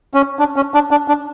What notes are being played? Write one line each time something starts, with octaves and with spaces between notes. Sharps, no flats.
C#4
D4
C#4
D4
D4
D4